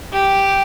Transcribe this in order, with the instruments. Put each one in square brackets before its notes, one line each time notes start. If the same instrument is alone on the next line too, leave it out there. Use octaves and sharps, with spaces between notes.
[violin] G4